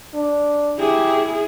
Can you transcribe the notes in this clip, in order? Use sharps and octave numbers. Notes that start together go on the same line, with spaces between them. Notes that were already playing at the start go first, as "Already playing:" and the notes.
D4
E4 G4 G#4